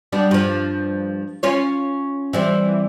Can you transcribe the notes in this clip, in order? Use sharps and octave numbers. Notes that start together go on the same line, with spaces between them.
G3 B3 D4
G2 F3
C#4 F4 C#5
E3 G3 C4